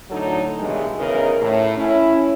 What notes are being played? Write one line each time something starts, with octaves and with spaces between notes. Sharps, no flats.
A2 D3 F#3 D4 D#4 A4
G2 B2 D#3 E3 G#3
E2 C#3 E3 D#4 A#4
A2
C#4 E4